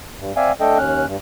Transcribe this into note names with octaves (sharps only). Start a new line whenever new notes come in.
G2
C4 D5 E5 F5 G#5
A3 D4 A4 D#5 G5
D#2 C#4 F6 F#6
G2